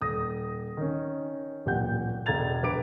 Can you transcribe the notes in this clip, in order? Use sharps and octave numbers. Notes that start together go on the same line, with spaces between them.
D#1 D#6 A#6
D#3 C#4
D1 A1 A#2 G4 F#5 G6
E1 A#5 G#6 A6 F7
A#1 B4 D6 D7